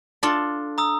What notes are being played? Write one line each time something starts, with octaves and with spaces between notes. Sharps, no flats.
D4 F4 A4
A#5 D#6 E6